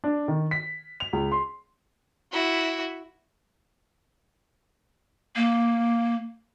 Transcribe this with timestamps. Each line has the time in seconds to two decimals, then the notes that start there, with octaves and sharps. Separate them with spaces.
0.04 D4
0.28 D#3
0.51 B6
1.00 F7
1.13 C#2
1.32 C6
2.32 E4 F#4
5.36 A#3